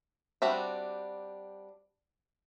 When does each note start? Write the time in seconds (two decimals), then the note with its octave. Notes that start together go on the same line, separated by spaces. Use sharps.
0.42 G3 C4 D4 F#4 E5